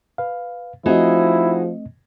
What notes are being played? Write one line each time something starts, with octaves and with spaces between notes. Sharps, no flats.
B4 F5
F3 A3 C4 D#4 E4 F#4 G#4 D#5